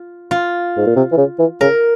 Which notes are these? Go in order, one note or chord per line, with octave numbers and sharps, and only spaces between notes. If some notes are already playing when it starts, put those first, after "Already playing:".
Already playing: F4
F4
G#2
A#2
C3
E3
C#3
E3
C#3 A#4